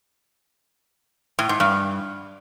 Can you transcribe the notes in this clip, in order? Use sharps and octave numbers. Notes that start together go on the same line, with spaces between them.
A2
G#2
G2